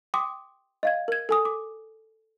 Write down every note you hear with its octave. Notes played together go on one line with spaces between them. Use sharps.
G5 C6 D6 D#6
D#5 F5 G#6
A#4 G#6
A4 G#5 D#6
D6